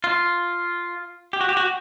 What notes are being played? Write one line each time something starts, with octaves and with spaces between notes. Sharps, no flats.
F4
G4
F#4
G4
F#4